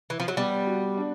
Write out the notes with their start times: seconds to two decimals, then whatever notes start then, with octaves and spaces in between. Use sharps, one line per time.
0.10 E3
0.20 F3
0.28 F#3
0.37 G3 B3
0.67 F#4
0.97 D4